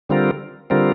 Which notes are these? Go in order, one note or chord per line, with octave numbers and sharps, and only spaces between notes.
D3 G3 C4 F4 A#4
D3 G3 C4 F4 A#4